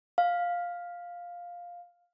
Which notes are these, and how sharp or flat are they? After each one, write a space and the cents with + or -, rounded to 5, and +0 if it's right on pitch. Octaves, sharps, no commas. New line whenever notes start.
F5 +5